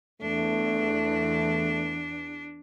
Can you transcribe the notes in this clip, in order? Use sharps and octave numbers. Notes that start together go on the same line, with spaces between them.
E2 A3 D4